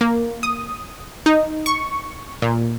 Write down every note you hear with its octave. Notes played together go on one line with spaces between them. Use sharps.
A#3
D#6
D#4
C#6
A#2